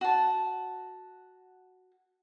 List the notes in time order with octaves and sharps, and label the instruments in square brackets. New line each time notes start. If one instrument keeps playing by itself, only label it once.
[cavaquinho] F#4 A5